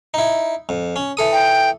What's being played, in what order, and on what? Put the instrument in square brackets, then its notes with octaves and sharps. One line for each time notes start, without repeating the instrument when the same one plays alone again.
[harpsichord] D#4 E4
F2
C#4
E3 A4 D#6
[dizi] G5